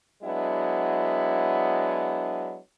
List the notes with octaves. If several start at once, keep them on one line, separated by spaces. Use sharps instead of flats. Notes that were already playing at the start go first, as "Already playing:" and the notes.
F#3 G#3 B3 D4 E4